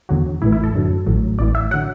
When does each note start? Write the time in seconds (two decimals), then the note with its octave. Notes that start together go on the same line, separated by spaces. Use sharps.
0.09 E2 D3 F#3
0.42 A1 A2 E3 E4
0.52 E4
0.64 A4
0.74 F#2 D3 F#3
1.06 A1 A2 F#3
1.39 A1 A2 E3 D5
1.55 E5
1.71 D3 F#3 F#5